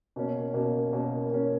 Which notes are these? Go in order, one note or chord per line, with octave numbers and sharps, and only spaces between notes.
B2 A#3 C#4
B2 A#3 C#4
B2 A#3 C#4
B2 A#3 C#4